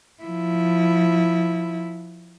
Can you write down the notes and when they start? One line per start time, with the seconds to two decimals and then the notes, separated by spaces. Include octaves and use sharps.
0.23 F3 E4